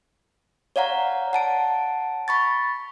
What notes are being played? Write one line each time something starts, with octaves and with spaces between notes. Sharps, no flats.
C#5 D5 F5 F#5 A#5
F#5 A5 D7
B5 C#6 A6